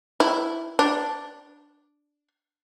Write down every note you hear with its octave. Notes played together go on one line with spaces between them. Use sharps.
E4
D4